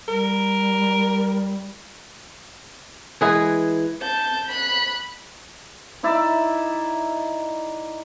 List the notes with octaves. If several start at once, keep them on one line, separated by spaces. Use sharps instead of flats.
G3 A#4
E3 G#3 G#4 B4
A5 G6
B5 F#6
D#4 E4 D5 E5